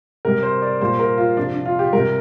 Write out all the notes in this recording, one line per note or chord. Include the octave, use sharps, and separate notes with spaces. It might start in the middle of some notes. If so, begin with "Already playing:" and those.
C3 G3 A#4
C5
D5
A#2 G3 C5
A#4
F4
C3 F3 D4
D4
F4
G4
C3 G3 A#4